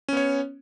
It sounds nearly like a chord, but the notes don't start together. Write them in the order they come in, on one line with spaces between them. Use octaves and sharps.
C#4 B3 C#5